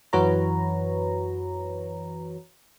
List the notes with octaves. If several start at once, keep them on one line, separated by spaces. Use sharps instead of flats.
F#2 E3 F#4 B4 C#5 A#5